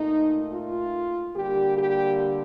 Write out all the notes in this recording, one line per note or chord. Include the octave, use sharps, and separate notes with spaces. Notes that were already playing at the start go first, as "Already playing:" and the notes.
Already playing: A#2 A3 D#4
F4
D3 G3 A#3 G4
G4